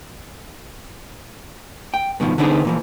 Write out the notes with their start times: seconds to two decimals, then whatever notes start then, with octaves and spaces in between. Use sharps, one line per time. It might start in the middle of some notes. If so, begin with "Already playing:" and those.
1.94 G5
2.20 G2 B2 D#3 F3
2.38 D3 B3 C4 D4 D#4 G#4
2.65 A#2 E3 F3